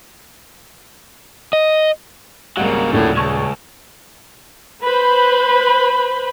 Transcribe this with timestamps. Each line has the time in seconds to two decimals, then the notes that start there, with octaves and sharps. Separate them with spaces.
1.53 D#5
2.57 G#1 C#2 C#3 F#3 G3 A#3 F5 F#5
2.92 D#1 A2 D3 A3 A#3 D5 A6
3.15 C#2 C#3 A5 C#6 G#6
4.84 B4 C5 B5